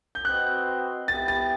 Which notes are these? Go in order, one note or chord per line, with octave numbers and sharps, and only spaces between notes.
G6
C4 F#4 B4 D#5 F#6
B3 E4 G4 A6
A6